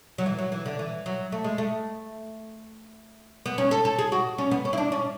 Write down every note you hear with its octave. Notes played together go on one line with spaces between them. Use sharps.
F#3
E3
F#3
E3
D3
E3
F#3
A3
G#3
A3
B3
C#4
A4
A4
G#4
F#4
C#4
B3
C#4
E4
D4
C#4